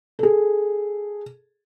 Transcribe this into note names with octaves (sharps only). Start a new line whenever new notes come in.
G#4 A4